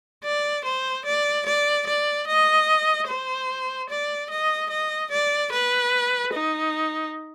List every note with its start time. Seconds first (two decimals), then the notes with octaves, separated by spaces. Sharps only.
0.24 D5
0.65 C5
1.05 D5
1.46 D5
1.87 D5
2.27 D#5
3.08 C5
3.90 D5
4.30 D#5
4.70 D#5
5.11 D5
5.52 B4
6.33 D#4